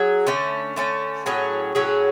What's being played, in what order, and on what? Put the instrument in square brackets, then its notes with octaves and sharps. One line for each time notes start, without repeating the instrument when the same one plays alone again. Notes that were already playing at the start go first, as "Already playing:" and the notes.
Already playing: [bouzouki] F#3 G#4
D3 A3 C#4
D3 A3 C#4
A2 F#3 C#4 G#4
A2 F#3 C#4 G#4